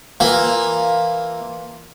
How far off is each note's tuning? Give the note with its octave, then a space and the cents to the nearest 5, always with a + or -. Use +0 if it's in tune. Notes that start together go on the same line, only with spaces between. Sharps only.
E3 +0 A#3 +0 F4 +5